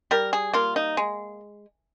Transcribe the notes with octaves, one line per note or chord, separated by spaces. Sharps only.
G3 A#4
G#4
A#3 F4
D#4
G#3